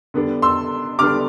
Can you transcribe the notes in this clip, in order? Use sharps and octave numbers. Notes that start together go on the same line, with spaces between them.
D3 G3 B3 D4
C6 E6
D3 G3 B3 D4 D6 F6